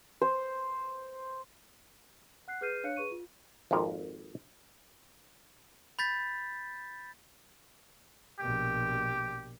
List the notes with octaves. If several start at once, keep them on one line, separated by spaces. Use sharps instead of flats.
C5
F#5 F#6 C7
G#4 B4 F6 G6 C7 D#7
D4 C#5 F5 F#6 C#7
G#4 B4 C#6 D#7
F4
G#1 F2 F3 A#3 A#4
B5 G6 A6 B6
A#1 B2 G4